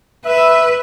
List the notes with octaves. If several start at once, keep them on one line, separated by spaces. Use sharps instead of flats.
B4 E5